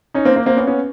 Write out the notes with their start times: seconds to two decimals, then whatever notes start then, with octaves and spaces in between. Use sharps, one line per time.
0.14 C#4 D#4
0.25 A#3 C4
0.36 A#3 C4
0.46 A#3 C4
0.57 B3 C#4
0.67 B3 C#4